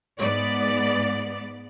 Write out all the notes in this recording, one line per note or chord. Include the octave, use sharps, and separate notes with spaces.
G#2 B3 D5